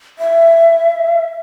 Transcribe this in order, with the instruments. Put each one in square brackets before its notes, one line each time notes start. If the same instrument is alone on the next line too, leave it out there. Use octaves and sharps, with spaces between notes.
[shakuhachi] E5